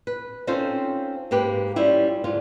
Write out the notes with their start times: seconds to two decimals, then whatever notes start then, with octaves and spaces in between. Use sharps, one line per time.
0.07 B4
0.47 C4 C#4 D#4 F4 A4 C5
1.31 G#2 A#3 G4 B4
1.76 G3 C#4 E4 F4
2.24 G#2 D3 F4